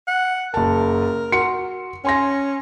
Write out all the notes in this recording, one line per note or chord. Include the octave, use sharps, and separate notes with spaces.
F#5
F#1 A#4 A5
F#4 C6 C#7
C#4 G#5 C6 A#6